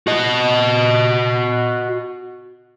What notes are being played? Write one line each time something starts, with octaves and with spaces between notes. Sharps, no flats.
F#4 D#5